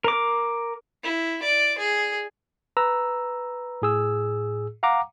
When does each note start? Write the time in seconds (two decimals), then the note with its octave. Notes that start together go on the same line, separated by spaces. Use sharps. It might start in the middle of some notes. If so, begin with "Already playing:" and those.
0.04 A#4 D6
1.04 E4
1.43 D5
1.78 G#4
2.77 B4 A#5 E6
3.82 A2 G#4 E6
4.83 F5 F#5 A#5 D6